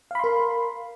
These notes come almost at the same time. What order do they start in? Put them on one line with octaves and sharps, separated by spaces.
F5 B5 C6 A#4